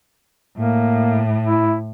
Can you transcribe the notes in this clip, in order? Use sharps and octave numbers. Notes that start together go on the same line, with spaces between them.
A2 A#3
E4